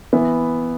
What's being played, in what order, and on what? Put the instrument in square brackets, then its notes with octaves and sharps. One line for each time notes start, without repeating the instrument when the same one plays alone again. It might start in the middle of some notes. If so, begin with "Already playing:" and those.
[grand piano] E3 B3 E5